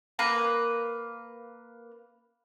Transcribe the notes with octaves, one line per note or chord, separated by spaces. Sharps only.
A#3 B4 A#5